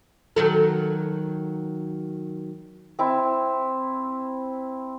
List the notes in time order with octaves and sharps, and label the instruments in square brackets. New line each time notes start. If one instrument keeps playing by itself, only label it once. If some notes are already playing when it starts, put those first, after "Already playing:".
[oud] D#3 F#3 A4
[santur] C4 E4